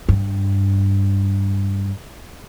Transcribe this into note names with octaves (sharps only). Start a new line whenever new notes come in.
G2